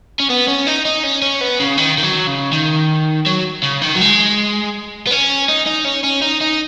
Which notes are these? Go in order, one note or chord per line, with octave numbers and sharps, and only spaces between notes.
C#4
B3
C#4
D#4
D#4
C#4
C#4
B3
C#3
D#3
D#3
F#3
C#3
D#3
F#3
C#3
D#3
F#3
G#3
B3
C#4
D#4
D#4
C#4
C#4
D#4
D#4